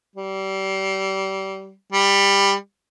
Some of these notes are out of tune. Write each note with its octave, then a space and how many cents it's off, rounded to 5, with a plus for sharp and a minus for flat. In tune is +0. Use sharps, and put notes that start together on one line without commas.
G3 -30
G3 +15